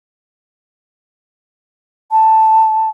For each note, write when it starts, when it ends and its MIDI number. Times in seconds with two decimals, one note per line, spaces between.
2.12 2.89 81